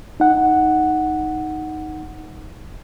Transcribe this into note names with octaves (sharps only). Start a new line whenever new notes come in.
D#4 F#5